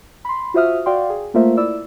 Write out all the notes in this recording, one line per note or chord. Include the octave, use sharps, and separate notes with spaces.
B5 C6
F4 F#4 C5 E5 D#6 F6
F#4 D5 F5 G5 C6
G#4
A3 A#3 F4 A#4 C5 E5
E4 D5 E6